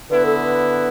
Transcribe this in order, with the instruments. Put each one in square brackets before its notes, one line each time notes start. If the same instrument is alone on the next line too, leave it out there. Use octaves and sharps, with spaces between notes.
[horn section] D3 B3 E4 [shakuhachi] B4
[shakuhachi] A4
B4